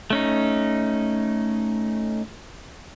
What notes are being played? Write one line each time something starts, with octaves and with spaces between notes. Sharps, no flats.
A3 C#4 D#4